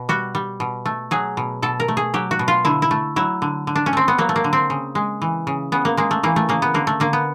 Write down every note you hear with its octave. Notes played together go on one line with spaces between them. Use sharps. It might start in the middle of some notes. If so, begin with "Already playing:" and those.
Already playing: B2
G3 F#4
G3
B2
A3
F#3 G#4
B2
B2 A4
A#4
A3
G#4
F#3 G4
F#4
B2
F4
D3 E4
E4
A3
F#3 E4
D3
D3
D4
C#4
A3 C4
B3
F#3 A#3
A3
A#3
D3
C4
C#3
G#3
E3
C#3
C#3 B3
A#3
G#3 A#3
A3
E3 A#3
A3
C#3 A#3
B3
D3 A#3
A3
D3 A#3
B3